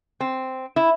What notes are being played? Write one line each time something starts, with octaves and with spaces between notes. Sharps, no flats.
C4
E4